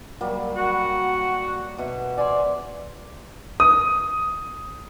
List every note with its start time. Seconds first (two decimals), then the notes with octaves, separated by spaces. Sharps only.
0.21 F#3 G3 A#3
0.56 F#4
1.78 B2 E5
2.18 C5 D5 G#5
3.60 D#6